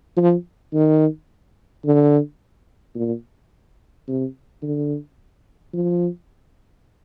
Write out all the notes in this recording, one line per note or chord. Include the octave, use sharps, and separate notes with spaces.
F3
D#3
D3
A#2
C3
D3
F3